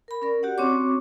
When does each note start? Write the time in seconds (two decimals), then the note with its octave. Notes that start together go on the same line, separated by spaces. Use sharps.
0.08 A#4 B5
0.22 C#4 A#4 D5
0.43 F#4 G4 D5 F#5
0.58 C4 C#4 F#4 C#5 C#6 D6